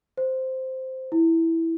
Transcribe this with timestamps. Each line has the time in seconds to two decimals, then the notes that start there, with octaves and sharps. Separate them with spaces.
0.17 C5
1.12 E4